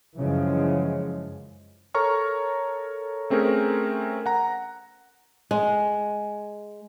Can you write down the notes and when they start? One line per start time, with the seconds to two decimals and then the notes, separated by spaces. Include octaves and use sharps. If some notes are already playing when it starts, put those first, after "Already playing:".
0.17 F#2 C#3 E3 F3 G#3
1.94 A4 A#4 C#5 A#5 C#6 F6
3.30 A3 C4 C#4 G#4 A#4
4.26 F#5 A#5
5.51 G#3